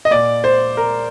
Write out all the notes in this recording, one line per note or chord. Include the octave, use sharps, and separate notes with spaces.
D#5
A#2 D5
C5
A#4